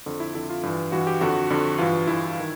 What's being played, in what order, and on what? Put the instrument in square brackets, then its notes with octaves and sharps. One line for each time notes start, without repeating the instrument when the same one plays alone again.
[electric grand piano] F2 D3
E4
F2 D3 E4
F4
G2 E3
G2 E3 F#4
G4
F2 D3 F#4
F2 D3
G2 E3 F4
G2 E3 E4
D#3